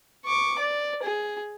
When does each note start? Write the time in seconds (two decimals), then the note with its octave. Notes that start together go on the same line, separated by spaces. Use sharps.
0.25 C#6 D6
0.59 D5
1.02 G#4